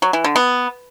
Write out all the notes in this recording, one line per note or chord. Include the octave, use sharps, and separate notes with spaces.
F#3
E3
D3
B3